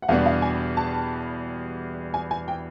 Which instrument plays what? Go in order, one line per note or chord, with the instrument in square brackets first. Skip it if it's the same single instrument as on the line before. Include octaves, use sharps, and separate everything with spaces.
[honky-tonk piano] F#5
[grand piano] E2 B2 G3 B3 D4 [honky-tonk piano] F5
[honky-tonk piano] F5
G#5
A5
G#5
G#5
G5